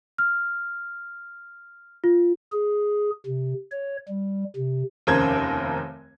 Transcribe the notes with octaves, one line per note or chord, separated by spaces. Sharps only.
F6
F4
G#4
C3
C#5
G3
C3
F1 D#2 C#3 A#4 C5 G#6